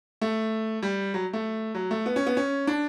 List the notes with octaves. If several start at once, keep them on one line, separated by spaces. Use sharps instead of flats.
A3
G3
F#3
A3
F#3
A3
B3
C#4
B3
C#4
D4